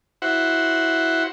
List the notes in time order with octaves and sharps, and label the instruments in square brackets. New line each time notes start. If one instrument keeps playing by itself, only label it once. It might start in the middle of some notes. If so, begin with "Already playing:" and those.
[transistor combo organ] E4 F#4 C5 F#5